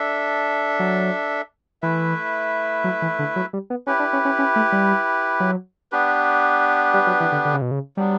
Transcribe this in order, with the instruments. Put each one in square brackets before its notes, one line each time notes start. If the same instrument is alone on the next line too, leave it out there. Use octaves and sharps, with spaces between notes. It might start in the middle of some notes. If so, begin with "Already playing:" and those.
Already playing: [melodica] D4 A4 E5
[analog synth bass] F#3
[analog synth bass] E3 [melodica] A3 E4 B4 E5
[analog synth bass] F#3
E3
D3
F#3
G3
B3
[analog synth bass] C#4 [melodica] E4 G4 B4
[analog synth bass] D4
C#4
C#4
C#4
A3
G3
F#3
[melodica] B3 D4 G4 B4
[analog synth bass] G3
F#3
E3
D3
D3
C#3
B2
C#3
[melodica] F#3 B3 D4 [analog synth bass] G3